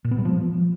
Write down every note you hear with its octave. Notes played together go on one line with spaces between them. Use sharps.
A#2
B3
G3
F3